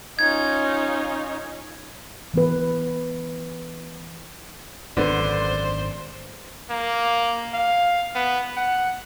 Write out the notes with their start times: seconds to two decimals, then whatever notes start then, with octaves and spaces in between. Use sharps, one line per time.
0.19 C#4 D#4 F4 G#6
2.34 E3 B3 B4
4.97 G#1 F#2 D3 B3 C5 D5
6.70 A#3
7.54 F5
8.15 B3
8.57 F#5